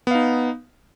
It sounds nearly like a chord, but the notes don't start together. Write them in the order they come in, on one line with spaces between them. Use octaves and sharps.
B3 F5 D#4